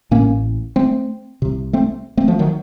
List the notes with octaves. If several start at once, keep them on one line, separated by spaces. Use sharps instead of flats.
A1 A2 A#3 C#4
A3 C4
C2 C3
A3 C4
A3 C4
F3 A3
D#3 F#3